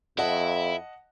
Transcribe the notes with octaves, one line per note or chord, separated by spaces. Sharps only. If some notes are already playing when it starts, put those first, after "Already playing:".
F2 E4 D#5 F#5 A5